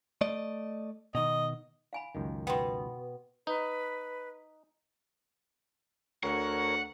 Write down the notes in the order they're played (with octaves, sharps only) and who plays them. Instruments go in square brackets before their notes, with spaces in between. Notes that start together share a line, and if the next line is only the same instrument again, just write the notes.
[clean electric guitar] A3 D5 D#5
[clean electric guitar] B2 D#3 [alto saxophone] D#5
[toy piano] F5 G#5 B5
[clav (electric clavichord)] C#2 F#2 D#3
[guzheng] B2 B3 [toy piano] G5 C6
[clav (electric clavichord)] D#4 [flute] B4
[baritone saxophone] D2 [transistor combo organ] A#4 C#5 [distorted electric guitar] F#5